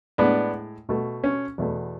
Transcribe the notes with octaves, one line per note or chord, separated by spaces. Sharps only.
A2 G#3 B3 D4
B2 A3
C#4
E2 B2 A3